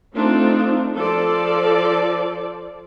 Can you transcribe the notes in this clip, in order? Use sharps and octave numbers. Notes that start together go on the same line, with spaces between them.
A3 C4 D4 D#4 F4
F3 A4 D5